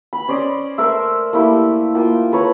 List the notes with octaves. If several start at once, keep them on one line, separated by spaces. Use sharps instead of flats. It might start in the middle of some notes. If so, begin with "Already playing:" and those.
B5
C#4 C5 D5 D#5
A3 A#4 C5 E5
A3 A#3 E4 G4
A#3 F4 G5
A4 B4 C#5 A#5